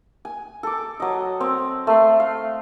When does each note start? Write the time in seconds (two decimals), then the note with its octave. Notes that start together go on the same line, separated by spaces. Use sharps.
0.25 G#5
0.63 A4 D6
1.00 F#3 D#5
1.40 C4
1.87 A3 C6
2.20 F5